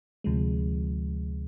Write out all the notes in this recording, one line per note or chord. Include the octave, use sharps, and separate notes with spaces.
D2 C3 F3 G#3